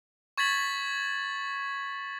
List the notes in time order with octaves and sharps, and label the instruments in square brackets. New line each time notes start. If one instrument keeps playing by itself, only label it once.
[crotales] C#6 G#6 A6 B6 F#7